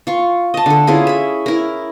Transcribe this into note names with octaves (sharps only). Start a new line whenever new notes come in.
F4 C#6
D#5 A5
D3 A4
C#4 E4 F4 G#4
E5 B5
E4 A#4